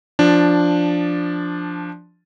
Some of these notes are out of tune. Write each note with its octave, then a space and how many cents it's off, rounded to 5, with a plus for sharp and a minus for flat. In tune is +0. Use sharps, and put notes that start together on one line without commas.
F3 +0 D4 +0